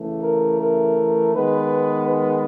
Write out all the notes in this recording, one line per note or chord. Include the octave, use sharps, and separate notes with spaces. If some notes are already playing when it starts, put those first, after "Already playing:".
Already playing: C#3 E3 A3
A#4
A#4
D#3 G#3 B3 B4
B4